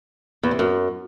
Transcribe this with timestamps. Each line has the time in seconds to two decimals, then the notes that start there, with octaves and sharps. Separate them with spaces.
0.43 E2
0.51 C3
0.59 F#2